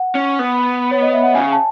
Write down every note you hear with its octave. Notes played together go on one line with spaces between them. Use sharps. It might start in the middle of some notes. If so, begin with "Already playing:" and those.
Already playing: F#5
C#4
B3
C#5
D#5
E5
F#5
C#3 G#5
A5